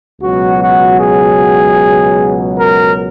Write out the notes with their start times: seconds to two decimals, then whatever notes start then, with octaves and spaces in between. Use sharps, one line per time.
0.21 C#2 B2 F#3 F#4
0.61 F#4
1.00 G#4
2.58 A#4